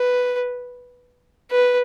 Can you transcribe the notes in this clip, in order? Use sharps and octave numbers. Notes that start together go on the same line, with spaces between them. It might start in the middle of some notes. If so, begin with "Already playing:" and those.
Already playing: B4
B4